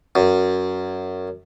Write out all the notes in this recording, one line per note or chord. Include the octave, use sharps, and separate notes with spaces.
F#2